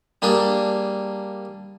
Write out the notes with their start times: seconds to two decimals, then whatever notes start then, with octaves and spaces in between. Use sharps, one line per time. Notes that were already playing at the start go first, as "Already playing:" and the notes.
0.22 G3 A#3 D4 G#4